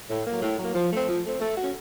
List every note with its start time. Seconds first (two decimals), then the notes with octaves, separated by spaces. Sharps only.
0.09 A2
0.25 F#3 A#3
0.42 A2
0.58 F#3 A#3
0.75 F3
0.91 A3 C4
1.07 F3
1.24 A3 C4
1.40 A3
1.56 C#4 F#4